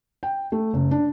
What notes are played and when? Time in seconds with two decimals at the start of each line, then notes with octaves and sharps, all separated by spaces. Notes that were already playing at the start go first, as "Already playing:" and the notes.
0.23 G5
0.52 A3
0.73 F#1
0.91 D4